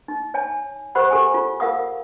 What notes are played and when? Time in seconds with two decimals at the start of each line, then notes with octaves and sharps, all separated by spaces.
0.08 D#4
0.34 C#5 G#5 A5
0.95 G4 A#4 C5 F#5 B5
1.11 G4 A4 G#5
1.34 F4
1.60 F4 A#4 F5 F#5 D#6